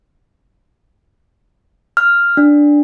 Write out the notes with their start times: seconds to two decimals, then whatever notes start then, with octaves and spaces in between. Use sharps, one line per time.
1.97 F6
2.37 D4